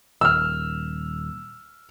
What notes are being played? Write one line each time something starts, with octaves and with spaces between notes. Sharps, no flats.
D#1 E6 F6